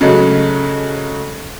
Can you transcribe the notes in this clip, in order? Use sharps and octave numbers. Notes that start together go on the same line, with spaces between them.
C#3 F#3 G#3 A3